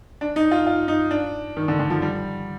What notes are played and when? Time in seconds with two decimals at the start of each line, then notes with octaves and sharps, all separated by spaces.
0.21 D4
0.36 D#4
0.51 F4
0.67 F4
0.88 D#4
1.11 D4
1.57 D#3
1.68 D3
1.79 D3
1.90 F3
2.02 G3